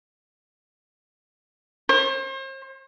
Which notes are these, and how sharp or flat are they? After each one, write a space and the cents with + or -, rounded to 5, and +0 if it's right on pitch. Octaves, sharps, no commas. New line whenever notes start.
C5 +40